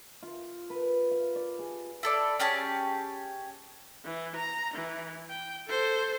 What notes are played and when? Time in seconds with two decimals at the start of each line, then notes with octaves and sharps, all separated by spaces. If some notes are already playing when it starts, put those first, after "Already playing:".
0.23 F4
0.70 B4
1.11 F5
1.36 D5
1.59 G#4
2.03 E4 A4 D5
2.40 C#4 G4 G#4 A5
4.05 E3
4.36 A#5
4.74 E3
5.29 G5
5.68 A4 C5